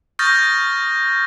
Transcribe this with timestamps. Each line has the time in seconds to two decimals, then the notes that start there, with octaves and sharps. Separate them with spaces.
0.19 C#6 D#6 F6 G6 A6 A#6